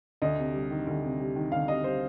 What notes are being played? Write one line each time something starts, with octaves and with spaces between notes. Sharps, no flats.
D2 D#5
C3
G3
D#3
D2
C3
G3
D#3
D2 F5
C3 D#5
G3 C5